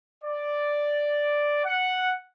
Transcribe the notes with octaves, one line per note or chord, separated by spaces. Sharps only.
D5
F#5